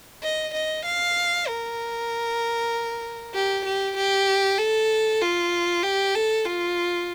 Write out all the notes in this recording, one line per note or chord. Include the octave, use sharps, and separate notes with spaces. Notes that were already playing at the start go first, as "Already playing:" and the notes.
D#5
D#5
F5
A#4
G4
G4
G4
A4
F4
G4
A4
F4